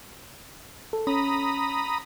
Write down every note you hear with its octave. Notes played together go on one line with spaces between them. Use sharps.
A4
C#4 A#5 B5 D#6